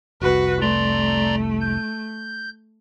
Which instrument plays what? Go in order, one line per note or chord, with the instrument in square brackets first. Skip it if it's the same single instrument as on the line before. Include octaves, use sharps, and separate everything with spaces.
[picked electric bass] F1 C2 [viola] F#4 B4
[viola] A3 [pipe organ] D5 A#5 C6
[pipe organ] G6